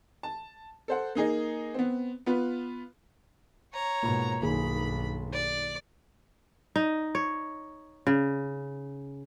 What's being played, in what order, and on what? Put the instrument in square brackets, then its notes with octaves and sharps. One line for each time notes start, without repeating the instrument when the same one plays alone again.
[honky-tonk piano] A5
A4 C5 F#5
A#3 D#4 G#4 D#5
B3 C4
B3 F4 B4
[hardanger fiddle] C#5 A#5
[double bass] G#2 B2 [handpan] A#3 F4
[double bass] B1 G2 [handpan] D#3 A#3 G#4 [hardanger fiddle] B5
[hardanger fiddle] D5
[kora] D#4
C#5
C#3